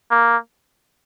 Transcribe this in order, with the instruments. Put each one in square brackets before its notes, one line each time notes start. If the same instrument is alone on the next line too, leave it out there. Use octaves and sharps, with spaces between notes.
[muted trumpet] A#3